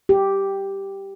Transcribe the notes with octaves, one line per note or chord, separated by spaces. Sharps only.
G4